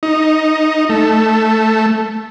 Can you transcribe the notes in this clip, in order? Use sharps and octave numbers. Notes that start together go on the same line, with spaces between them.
D#4
A3